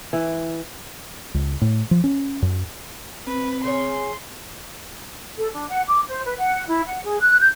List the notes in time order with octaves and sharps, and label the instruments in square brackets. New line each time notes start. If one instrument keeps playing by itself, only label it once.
[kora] E3
[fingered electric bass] C#2
A2
F3
C#4
F#2
[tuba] C4 [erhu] B4
[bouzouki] C#3 G#4 C#5 [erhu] C6
[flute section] A4
D4
F#5
D6
C5
B4
F#5
E4
F#5
G#4
F#6
G6